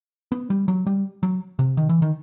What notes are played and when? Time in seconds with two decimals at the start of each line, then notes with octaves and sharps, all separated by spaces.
0.32 B3
0.50 G3
0.68 F#3
0.86 G3
1.23 F#3
1.59 C3
1.77 D#3
1.89 E3
2.02 D#3